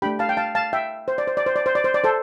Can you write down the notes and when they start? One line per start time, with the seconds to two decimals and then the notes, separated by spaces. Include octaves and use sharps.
0.02 A3 D4 G4 G5 B5
0.19 F5 A5
0.29 G5
0.37 F5 A5
0.55 F5 A5
0.73 E5 G5
1.08 C5
1.18 D5
1.27 C5
1.37 D5
1.46 C5
1.56 D5
1.66 C5
1.75 D5
1.84 C5
1.94 D5
2.04 A4 C5